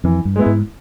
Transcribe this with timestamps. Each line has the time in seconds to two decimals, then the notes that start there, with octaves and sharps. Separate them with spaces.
0.04 F2 E3
0.25 G2
0.36 G#3 B3 E4
0.46 G#2